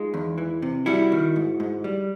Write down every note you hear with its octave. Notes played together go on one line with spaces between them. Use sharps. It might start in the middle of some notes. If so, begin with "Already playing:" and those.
Already playing: G#3 D#4 F4
E2
E3
C3
G3 E4 F#4
D#3
G#2
G#2
G3